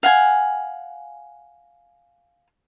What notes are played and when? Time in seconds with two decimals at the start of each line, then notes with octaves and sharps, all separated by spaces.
0.03 F5 F#5 G#5